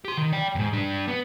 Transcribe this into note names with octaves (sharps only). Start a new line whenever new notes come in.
G4 C6
D#3
D5 G5
E2 G#2
G3 D4
B3